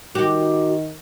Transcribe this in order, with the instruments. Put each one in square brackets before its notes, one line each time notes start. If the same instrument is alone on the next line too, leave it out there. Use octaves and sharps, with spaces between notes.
[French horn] D#3 [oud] F#4 G4